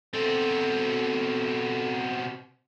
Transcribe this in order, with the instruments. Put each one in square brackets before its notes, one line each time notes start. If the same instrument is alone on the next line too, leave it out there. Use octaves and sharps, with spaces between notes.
[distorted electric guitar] B2 C4 [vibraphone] A4